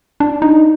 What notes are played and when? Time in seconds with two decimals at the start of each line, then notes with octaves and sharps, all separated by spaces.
0.20 D4
0.42 D#4